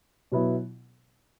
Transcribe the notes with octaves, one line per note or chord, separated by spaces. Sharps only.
B2 F#3 B3 E4